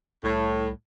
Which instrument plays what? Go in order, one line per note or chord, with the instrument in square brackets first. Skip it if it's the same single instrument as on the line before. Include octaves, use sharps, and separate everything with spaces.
[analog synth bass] C2 [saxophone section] A2